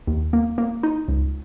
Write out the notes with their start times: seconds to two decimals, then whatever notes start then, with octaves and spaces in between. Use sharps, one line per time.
0.07 D#2
0.33 A#3
0.58 A#3
0.83 D#4
1.08 C#2